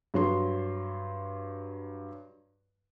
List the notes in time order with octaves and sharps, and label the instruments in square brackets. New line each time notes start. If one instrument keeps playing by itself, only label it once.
[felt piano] G2 F#3 C6